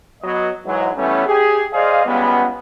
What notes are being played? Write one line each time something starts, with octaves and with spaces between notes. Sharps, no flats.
F#3 B3 D#5
G#2 E3 F#3
E3 G3 A3 B3 C#4
G4 G#4
G#4 C5 D5 D#5 F5
C#2 C#3 G3 B3